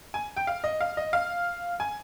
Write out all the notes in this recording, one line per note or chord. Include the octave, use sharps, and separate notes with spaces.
G#5
G5
F5
D#5
F5
D#5
F5
G#5